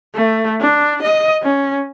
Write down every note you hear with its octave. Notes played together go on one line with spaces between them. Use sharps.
A3
D4
D#5
C#4